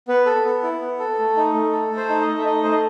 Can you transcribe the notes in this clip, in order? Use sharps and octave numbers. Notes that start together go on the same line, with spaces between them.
B3 B4
A4
B3
E4
B3
A4
A3
D#4
A3
A4
A3
C5
D#4
D#5
A3
E5
D#4 D#5
A3 C5
D#5